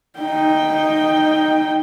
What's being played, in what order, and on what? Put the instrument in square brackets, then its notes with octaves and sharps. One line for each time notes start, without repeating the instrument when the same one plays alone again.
[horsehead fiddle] D#4 G5